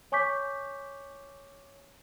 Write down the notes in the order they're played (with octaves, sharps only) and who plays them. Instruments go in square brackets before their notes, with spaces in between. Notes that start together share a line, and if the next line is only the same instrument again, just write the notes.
[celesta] C#5 G#5 C#6 D6 G6 B6